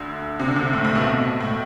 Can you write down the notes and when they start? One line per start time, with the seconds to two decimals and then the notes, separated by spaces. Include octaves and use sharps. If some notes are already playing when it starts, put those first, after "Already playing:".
Already playing: D2 D3
0.40 C3
0.48 D3
0.56 C2 C3
0.73 A2
0.85 A2
0.95 B1 B2
1.40 A2